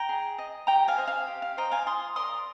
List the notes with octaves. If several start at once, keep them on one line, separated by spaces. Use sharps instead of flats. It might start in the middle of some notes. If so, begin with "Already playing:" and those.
Already playing: G5 A#5
G#4
D#5
G4 G5 A#5
F5 G#5
C5 D#5
F5
G4
F5
C5 D#5 G5 A#5
F5 G#5
F4 C6 D#6
A#4 D5 C6 D#6